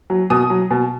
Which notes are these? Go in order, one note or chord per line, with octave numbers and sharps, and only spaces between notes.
F#3
B2 D#6
F#3
B2